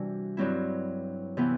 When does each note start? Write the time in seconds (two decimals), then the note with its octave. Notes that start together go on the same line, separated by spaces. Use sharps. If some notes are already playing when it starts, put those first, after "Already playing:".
Already playing: C3 E3 G3 D4 F#4
0.37 G2 F#3 C4 E4
1.37 C3 E3 B3